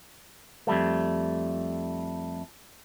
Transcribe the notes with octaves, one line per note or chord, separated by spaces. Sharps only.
F2 G3 A3